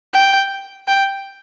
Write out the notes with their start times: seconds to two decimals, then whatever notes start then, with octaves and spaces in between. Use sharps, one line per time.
0.14 G5
0.87 G5